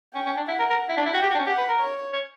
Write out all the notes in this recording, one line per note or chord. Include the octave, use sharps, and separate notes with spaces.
C#4 G5
C#4
D4
E4 F#5
A#4
A#4
E4
D4
E4
F#4 G5
G4
F#4
D4
C#4
G4 F#5
B4
A#4
C#5
C#5